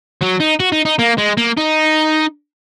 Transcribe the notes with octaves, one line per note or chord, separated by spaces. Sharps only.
F#3
D#4
F#4
D#4
D#4
A#3
G#3
A#3
D#4